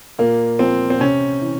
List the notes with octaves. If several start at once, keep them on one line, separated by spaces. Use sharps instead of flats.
A#2 A#3
F3 C4
C4
C3 C#4
E3